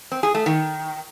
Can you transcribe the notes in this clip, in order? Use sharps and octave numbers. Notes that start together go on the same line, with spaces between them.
C4
G#4
A3
D#3